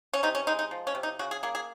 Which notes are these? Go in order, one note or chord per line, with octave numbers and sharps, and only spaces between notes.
C#4
C3 D#4
C#4
G#3 D#4
D#4
F3
C#4
C3
D#4
C#3 F#4
G#4
A#3 G#4
G#4